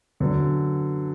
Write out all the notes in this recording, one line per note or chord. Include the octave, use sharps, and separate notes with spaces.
F#2 D3 F#3 B3